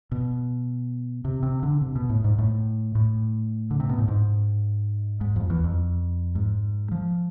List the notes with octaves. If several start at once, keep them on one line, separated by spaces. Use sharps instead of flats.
B2
C3
C3
D3
C3
B2
A2
G#2
A2
A2
D3
C3
B2
A2
G#2
G#2
F2
E2
F2
G#2
F3